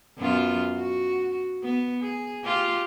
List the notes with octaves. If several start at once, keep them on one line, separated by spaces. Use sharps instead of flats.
F#2 B3 F4
F#4
B3
G#4
F4 G4